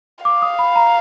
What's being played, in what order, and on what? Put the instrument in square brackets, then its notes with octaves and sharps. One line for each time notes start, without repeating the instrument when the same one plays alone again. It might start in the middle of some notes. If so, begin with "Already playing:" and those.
[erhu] F5 [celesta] D6
[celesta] D#6
B5
A#5